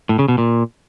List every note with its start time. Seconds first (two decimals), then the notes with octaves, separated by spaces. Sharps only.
0.09 A2
0.19 C#3
0.28 B2
0.38 A#2